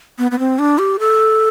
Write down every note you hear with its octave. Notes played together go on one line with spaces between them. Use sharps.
B3
B3
C4
D4
G4
A4